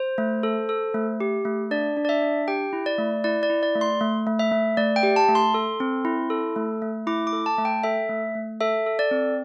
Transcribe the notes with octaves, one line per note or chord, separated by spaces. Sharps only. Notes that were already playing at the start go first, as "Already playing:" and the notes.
Already playing: C5
A3
A4
A4
A3
G4
A3
D4 D5
D4
D5
E5
D4
G4 G5
E4
D5
A3
E4 D5
D5
E4
D5
A3
C6
A3
A3
E5
A3
A3 D5
G5
G4
A5
A3
C6
A4
C4
E4
A4
A3
A3
E4 D6
D6
A4
A5
A3
G5
A4 E5
A3
A3
A4 E5
A4
D5
C4